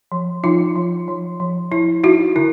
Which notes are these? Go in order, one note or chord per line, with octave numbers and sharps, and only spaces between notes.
F3
F3 D#4 F4
F3
F3
F3
F3 E4
D#4 E4 F#4
D3 E4